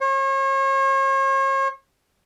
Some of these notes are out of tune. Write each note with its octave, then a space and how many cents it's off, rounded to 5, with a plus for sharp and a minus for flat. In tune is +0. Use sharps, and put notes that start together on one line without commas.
C#5 -40